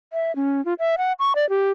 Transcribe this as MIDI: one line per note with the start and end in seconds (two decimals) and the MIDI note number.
0.13 0.35 76
0.36 0.63 61
0.65 0.74 65
0.79 0.95 76
0.98 1.13 78
1.19 1.33 85
1.35 1.48 74
1.49 1.71 67